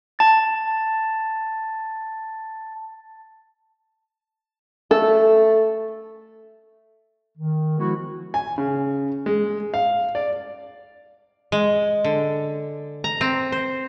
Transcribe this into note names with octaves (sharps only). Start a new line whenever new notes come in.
A5 A6
A3 A4
D#3
F3 G#3 B3 E4 F#4
G#5
C#3
G#3
F5
D5
G#3
D3
A#5
C4
C5